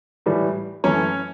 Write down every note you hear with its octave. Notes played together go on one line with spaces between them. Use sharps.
A2 E3 G3
F#2 E3 A3 C#4 C#5